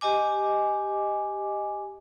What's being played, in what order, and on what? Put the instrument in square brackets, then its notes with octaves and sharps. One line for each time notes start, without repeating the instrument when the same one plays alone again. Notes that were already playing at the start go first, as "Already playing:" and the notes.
[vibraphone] G4 D#5 G#5 D6